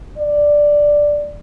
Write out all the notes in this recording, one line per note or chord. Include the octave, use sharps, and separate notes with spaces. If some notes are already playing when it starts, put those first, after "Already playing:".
D5